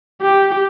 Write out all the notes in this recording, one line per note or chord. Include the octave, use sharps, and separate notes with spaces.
G4